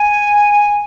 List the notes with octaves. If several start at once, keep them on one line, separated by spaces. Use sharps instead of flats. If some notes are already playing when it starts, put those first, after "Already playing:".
Already playing: G#5